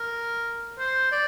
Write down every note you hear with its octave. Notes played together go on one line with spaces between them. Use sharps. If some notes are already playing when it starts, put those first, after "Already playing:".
Already playing: A#4
C5
D5